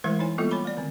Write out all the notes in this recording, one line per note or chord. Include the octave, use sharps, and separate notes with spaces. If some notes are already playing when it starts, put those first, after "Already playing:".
E3 G#3 A3 E4 A#4 C5
D#4 E4 C#5 G#5
G3 G#3 A#3 B3 F4 A4
C#5 G#5 B5 D6
A3 D5
D3 D#3 C4